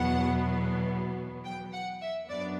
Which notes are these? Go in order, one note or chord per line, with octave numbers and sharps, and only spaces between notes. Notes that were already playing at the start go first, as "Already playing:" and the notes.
Already playing: E2 B2 F#3 B3 F#5
G5
F#5
E5
F#2 F#3 B3 D4 D5